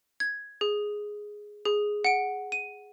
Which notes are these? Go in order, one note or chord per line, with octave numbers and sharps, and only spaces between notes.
G#6
G#4
G#4
F#5 D7
D#7